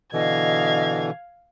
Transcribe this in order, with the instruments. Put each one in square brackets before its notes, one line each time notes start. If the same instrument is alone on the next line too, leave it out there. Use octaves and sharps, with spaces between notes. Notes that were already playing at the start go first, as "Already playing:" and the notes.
[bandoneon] B2 D3 E3 [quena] D#5 [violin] F5 G#6